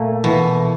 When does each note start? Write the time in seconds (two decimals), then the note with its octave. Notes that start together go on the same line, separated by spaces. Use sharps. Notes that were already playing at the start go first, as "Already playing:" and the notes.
Already playing: A#2 A3
0.24 B2 E3